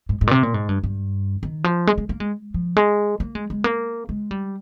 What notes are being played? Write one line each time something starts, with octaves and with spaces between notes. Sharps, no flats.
G#2
G#2
A#2
C3
A#2
G#2
G2
G2
D#3
F3
G#3
G#3
A#3
G#3
F3
G#3
A#3
G#3
G#3
A#3
G#3
G3